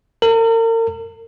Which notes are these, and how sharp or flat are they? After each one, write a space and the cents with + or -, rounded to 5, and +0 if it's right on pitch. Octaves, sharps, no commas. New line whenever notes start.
A#4 -40